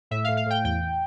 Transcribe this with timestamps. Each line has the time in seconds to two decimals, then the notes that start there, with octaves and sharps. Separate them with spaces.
0.11 A2 E5
0.24 F5
0.28 A2
0.37 F5
0.46 A2 G5
0.64 E2 G5